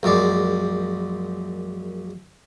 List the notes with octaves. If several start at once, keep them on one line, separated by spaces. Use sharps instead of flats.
A#1 F#2 G#3 D5